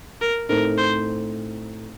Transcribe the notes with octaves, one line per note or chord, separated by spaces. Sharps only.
A#4
A2 A3 C4 D#4 A4 A#4
C5